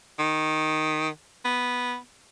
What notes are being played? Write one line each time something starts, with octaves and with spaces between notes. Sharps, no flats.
D#3
B3